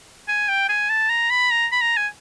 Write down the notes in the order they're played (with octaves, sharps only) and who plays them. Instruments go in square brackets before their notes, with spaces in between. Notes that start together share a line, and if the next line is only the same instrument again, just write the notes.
[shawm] G#5
G5
G#5
A5
A#5
B5
A#5
B5
A#5
G#5